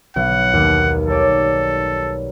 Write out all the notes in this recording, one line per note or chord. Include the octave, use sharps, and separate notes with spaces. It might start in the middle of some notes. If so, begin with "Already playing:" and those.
B1 F#5
D#2
G3 A4 C#5 D5